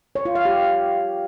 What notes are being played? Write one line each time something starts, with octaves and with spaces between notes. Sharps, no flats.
C#5
F4
F5
G4